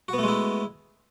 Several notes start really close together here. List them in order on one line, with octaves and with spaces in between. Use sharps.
F#4 B3 A3 G#3 E4